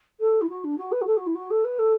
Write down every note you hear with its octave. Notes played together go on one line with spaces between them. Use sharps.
A4
E4
F#4
D4
F#4
B4
F#4
A4
F#4
E4
F#4
A4
B4
A4